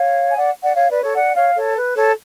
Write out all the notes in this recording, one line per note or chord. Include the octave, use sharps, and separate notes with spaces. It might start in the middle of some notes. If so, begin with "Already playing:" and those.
Already playing: C#5 F5
G#5
D5 F#5
D5 F#5
C#5 F5
B4 D5
A4 C#5
D5 F#5
C#5 F5
A4 C#5
B4
A4 C#5